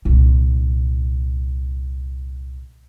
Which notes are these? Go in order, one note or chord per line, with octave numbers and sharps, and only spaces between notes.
C2 A#2